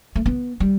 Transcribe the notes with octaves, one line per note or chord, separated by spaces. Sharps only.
A3
B3
G3